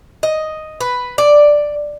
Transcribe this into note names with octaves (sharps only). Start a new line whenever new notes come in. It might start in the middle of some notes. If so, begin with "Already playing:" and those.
D#5
B4
D5